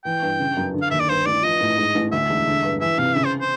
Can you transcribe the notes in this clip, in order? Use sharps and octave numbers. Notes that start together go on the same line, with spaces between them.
E3 G5
G2
C#3
F#2
D3
F5
D#2 E5
D5
G2 C5
A1 D5
F3 D#5
A2
G#2
A1
D2 E5
E1
D3
G2
E3 E5
C3 F5
C#3 E5
C5
C5